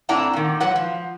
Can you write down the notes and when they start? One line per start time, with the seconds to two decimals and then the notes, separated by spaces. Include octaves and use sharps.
0.09 A2 C4 D4 E4 F#5 A#5
0.33 A#2 D#3
0.60 G#2 F#3 B4 F#5
0.76 F3